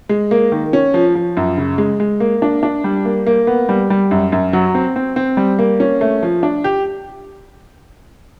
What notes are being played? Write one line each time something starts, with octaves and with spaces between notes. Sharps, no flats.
G#3
A#3
D#3
C#4
F3
F3
F#2
C#3
G#3
G#3
A#3
D4
D4
G3
A#3
A#3
B3
G3
G3
F#2
F#2
F#3
C4
C4
C4
G3
A#3
C#4
A3
F3
D4
G4